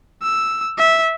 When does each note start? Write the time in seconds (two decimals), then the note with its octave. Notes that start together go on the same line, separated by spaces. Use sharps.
0.22 E6
0.78 E5